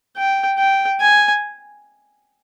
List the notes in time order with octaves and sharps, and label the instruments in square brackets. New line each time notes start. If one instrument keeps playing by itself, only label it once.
[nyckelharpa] G5
G5
G#5